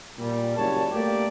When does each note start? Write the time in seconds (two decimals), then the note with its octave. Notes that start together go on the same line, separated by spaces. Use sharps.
0.17 A#2 G3
0.56 F#1 G3 C#5 A5
0.91 A3 A#3 G4 D5